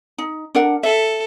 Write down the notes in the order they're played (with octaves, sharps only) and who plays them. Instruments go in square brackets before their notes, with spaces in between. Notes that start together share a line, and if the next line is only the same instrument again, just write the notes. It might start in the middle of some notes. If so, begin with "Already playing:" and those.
[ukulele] D#4
D4 A#4 F#5
[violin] A4 [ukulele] E5